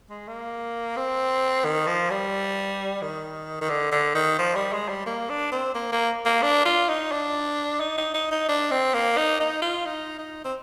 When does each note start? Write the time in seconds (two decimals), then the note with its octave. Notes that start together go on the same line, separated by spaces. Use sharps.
0.10 G#3
0.28 A#3
0.97 C4
1.65 D#3
1.87 F3
2.10 G3
3.02 D#3
3.61 D#3
3.70 D3
3.92 D3
4.15 D#3
4.39 F3
4.55 G3
4.73 G#3
4.89 G3
5.06 A#3
5.30 D4
5.52 C4
5.75 A#3
5.92 A#3
6.26 A#3
6.43 D4
6.66 F4
6.89 D#4
7.12 D4
7.80 D#4
7.98 D#4
8.14 D#4
8.31 D#4
8.49 D4
8.71 C4
8.94 A#3
9.17 D#4
9.40 D#4
9.62 F4
9.85 D#4
10.19 D#4
10.45 C4